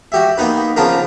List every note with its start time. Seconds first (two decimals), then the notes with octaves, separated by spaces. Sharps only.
0.12 F#4 G4 E5
0.38 A#3 B3 D#4 B4
0.76 C#3 F3 B3 D4 F4 A#4